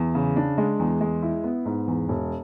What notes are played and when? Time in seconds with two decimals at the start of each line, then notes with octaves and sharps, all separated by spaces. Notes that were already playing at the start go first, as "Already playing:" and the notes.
Already playing: E2
0.15 C#3
0.36 D4
0.58 G#3
0.79 E2
1.01 G#3
1.22 E4
1.44 B3
1.66 G#2
1.87 E2
2.09 E1